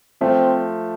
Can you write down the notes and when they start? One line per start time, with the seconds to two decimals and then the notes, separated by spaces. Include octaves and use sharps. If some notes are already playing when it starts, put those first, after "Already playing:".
0.21 F3 A3 C4